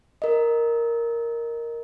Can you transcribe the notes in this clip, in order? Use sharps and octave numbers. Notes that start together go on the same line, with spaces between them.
A#4 D#5